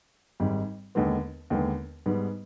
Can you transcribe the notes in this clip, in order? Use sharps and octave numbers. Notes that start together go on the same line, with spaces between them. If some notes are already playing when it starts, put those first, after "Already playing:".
G#1 G#2 G3
D#2 D3 G#3 B3
D#2 D3 G#3 B3
G#2 G3 B3